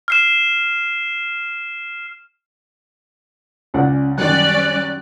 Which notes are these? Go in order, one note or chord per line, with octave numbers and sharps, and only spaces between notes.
F6 C7 E7
C#2 C#4 D5 F#5
F#2 D#3 G3 C#4 D5 F#6